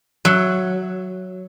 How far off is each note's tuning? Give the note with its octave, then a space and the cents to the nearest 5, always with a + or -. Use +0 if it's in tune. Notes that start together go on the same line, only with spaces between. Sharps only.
F#3 +0 E5 +10